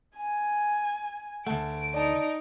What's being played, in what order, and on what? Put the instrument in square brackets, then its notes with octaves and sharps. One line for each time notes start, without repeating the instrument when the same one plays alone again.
[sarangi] G#5
[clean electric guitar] D2 A3 [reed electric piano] F#5 A5 [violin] D7
[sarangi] D#4 [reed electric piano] D5 A5